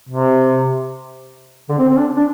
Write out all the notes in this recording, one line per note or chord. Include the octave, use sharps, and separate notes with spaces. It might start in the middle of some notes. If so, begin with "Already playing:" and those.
C3
D3
C4
C4
D4
D4